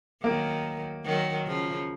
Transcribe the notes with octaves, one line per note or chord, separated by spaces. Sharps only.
D#3 F#3 A#3
D#3 F#3
C#3 F3